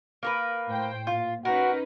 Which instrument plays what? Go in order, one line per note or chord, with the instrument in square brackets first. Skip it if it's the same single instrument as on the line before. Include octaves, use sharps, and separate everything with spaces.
[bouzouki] A#3 A#4 B4
[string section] A2 C5 G5
[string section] A#2 [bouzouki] F4
[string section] C#4 D#4 B4 [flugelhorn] F#4 [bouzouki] A#4